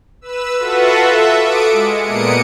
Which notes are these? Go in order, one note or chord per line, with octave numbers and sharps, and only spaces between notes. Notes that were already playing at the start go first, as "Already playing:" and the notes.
B4 E6
F4 F#4 A4 B4 E5 F#5
A4 E5
D6 D#6 C#7 D7
G#3
A#2 A#3 B3 D#6 C#7 D7